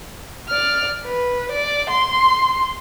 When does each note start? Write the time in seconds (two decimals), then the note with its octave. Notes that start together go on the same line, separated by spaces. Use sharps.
0.48 D5 F6
1.05 B4
1.51 D5
1.89 C6